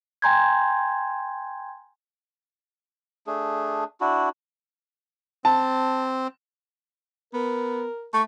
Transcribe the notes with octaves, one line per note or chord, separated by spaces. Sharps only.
G5 G#5 A#5 C6 G6 G#6
A3 D4 G#4
D4 E4 F#4
C4 A5
B3 A#4
A3 C#6